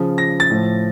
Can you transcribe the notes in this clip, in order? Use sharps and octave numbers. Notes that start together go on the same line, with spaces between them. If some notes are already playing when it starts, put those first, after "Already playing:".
Already playing: C#3 F3
A#6
A6
A2 F3